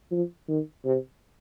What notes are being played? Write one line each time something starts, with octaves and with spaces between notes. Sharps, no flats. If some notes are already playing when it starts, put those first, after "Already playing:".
F3
D#3
C3